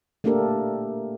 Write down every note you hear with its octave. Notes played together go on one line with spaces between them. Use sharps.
A3 A#3 D4 G4 A4 A#4